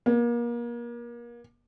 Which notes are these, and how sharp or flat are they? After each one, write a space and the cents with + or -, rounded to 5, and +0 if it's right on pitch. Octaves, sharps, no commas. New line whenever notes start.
A#3 +35